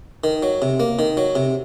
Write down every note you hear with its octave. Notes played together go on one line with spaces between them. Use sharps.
D#3
F#3
C3
A#3
D#3
F#3
C3